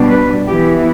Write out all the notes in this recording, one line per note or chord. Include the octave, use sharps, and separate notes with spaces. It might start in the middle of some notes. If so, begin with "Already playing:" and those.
Already playing: B2 G3 D4
B4
E3 B3 E4 G4